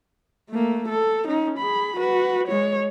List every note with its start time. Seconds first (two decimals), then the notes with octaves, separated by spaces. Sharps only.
0.50 A3 A#3
0.89 A4
1.26 C#4 D#4
1.58 G#4 B5
1.96 F#4 B4
2.48 G#3 C#5